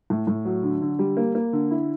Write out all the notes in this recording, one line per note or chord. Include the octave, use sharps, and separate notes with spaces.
A2
A2
F#3
D3
D3
G3
A#3
A#3
D3
E4